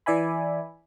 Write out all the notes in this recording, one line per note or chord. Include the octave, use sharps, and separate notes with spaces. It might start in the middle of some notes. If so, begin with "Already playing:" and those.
E3 D5 E5 G#5 B5